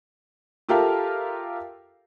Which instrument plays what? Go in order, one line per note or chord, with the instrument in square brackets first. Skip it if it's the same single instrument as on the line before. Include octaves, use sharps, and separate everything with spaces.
[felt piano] F4 G4 A4 A#4 E5 F5